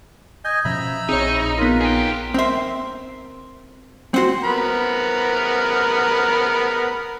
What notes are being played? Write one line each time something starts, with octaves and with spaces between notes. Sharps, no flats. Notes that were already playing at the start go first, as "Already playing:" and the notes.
D#5 G#5 G6
B2 F3 C#4 E5 A#5 B5
A#1 C4 D#4 G#4 C#5
B3 D#4 F4 A#4
G#4 G5
C4 A#4 C5 E5
C4 F#4 C5 F#5
B3 A#4 B5